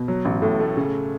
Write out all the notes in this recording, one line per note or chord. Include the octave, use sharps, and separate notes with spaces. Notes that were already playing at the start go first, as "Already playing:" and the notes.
Already playing: B2
F#3
A1
A2
A3
C#3